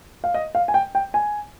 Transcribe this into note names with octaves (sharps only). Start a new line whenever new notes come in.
F5
D#5
F5
G#5
G5
G5
G#5